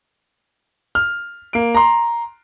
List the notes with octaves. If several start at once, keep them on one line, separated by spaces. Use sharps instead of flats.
F6
A#3 D7
A#5 C6